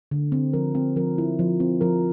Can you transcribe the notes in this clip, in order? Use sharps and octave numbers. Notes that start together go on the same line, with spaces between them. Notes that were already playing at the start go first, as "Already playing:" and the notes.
D3
C4
F3 A#4
C4
F3 A#4
E4
F3
C4
F3 A#4